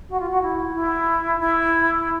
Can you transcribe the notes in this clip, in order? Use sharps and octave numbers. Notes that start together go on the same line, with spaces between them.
F#4
F4
F#4
E4
E4
E4